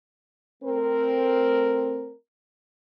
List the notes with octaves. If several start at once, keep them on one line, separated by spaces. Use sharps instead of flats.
A3 C4 A#4